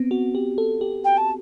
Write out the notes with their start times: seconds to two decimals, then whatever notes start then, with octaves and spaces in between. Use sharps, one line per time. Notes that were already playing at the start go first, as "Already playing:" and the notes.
Already playing: B3 C4
0.11 F#4
0.35 G4
0.58 A4
0.81 G4
1.04 G5
1.17 A5